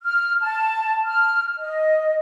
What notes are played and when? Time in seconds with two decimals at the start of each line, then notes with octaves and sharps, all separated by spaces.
0.02 F6
0.42 A5
1.06 F6
1.59 D#5